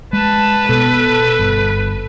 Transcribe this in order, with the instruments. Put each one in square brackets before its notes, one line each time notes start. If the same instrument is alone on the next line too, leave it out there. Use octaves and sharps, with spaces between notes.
[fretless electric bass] G#3 [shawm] B4 [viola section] A5
[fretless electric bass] B2 [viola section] A4
[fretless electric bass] G1